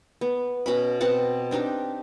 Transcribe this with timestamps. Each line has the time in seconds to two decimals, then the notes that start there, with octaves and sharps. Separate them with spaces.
0.21 B3
0.66 B2 C#4 B5
1.00 B2 C4 F#5 A5
1.51 C4 D4 D#4 G4